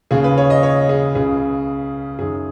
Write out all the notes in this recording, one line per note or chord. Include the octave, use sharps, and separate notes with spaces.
D#2 C#3 G#4
B4
C#5
D#5
C#5
G#4
C#2 C#3 G#4
F#2 D#3 G#4